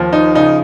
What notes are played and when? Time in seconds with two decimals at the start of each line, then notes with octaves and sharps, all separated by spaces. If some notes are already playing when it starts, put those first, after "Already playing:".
Already playing: D#2 F3
0.13 D#4
0.35 C#3 D#4